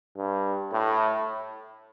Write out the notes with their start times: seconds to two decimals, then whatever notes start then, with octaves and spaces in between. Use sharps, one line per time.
0.17 G2
0.73 A2